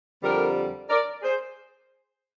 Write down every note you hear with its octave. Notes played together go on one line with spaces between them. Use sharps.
F2 D3 G3 G4 A#4
A#4 D5
G#4 C5